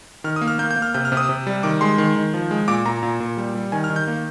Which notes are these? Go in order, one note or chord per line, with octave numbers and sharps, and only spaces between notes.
D#3 F6
D#6
A#3
F6
A#3 G6
G6
A#3
F6
C3 G6
F6
C3
D#6
C3
G3
D#3 D6
G#3 C6
D#3
D#3
F3
G#3
A#2 D6
A#2 A#5
A#2
A#2
G3
G3
D#3 G#5
F6
D#3
G6
A#3